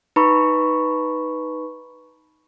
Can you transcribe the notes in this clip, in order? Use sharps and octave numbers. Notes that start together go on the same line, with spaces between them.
D#4 B4 A#5 B5 C#6